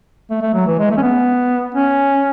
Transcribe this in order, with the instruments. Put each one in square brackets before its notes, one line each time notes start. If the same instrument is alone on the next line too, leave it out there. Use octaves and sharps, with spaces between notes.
[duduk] A3
A3
F#3
E3
G#3
A3
C#4
B3
C#4